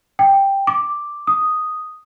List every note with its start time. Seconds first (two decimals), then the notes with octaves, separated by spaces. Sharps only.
0.19 G5
0.67 D6
1.27 D#6